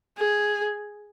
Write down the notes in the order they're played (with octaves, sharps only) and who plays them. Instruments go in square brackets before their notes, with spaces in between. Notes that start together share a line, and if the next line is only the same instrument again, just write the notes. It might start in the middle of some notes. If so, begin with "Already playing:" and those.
[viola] G#4